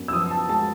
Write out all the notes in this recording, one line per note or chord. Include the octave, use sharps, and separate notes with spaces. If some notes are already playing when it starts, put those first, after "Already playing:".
Already playing: F#2 B3
E6
F3 D#6
A5
G#3 A5